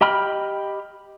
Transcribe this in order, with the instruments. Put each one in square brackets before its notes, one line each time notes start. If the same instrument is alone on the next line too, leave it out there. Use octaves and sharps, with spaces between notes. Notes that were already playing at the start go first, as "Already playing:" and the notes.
[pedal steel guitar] G4 D#5 G5 B5 F6